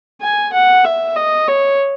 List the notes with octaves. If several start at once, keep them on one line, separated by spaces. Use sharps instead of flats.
G#5
F#5
E5
D#5
C#5